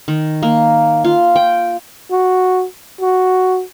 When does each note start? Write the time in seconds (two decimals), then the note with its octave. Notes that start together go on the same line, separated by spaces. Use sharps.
0.08 D#3
0.43 A#3
1.04 F4
1.36 G5
2.11 F#4
3.01 F#4